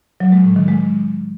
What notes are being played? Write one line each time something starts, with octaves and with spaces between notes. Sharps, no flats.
F#3
G#3
A2
D#3
G#3